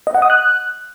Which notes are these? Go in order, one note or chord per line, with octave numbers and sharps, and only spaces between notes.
D#5
F#5
D#6
F#6